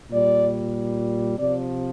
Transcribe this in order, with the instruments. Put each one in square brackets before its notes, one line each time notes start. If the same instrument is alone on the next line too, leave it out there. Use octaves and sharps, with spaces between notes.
[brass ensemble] A#2 G3 D5
C3 F3 D5